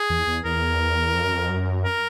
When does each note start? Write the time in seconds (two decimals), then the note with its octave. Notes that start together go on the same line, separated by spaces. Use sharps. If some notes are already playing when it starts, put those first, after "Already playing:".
Already playing: G#4
0.10 E2
0.27 E2
0.45 E2 A#4
1.14 F2
1.24 F#2
1.33 F2
1.49 F#2
1.84 A#4